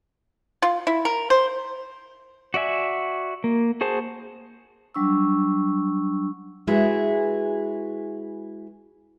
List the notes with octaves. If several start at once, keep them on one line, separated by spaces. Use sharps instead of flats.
F4
E4
A#4
C5
F#4 D5 E5 G#5
A#3
F#4 G#4 C5 A5
F#3 G3 D4 C#6 E6
G#3 E4 F#4 G#4 B4 E5